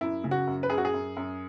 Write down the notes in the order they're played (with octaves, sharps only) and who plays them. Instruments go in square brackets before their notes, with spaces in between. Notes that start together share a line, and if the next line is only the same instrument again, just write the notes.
[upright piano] F#2 E4
C#3
F#4
F#2
B4
F#2 G#4
F#4
G#4
F#2
F#2